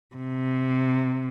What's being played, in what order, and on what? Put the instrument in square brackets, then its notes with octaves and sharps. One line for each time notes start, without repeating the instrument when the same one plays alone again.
[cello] C3